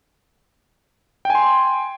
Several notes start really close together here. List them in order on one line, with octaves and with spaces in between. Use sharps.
G5 G#5 C6